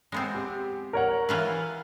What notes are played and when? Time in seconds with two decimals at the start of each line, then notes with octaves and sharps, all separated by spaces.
0.12 G#3 B3 C4
0.35 G4
0.93 A#4 C#5 F#5
1.29 E3 F4 B4